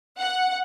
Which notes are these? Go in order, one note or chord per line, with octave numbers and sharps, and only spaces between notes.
F#5